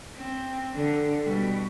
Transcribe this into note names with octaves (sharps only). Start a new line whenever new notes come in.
C4
D3
B2 G3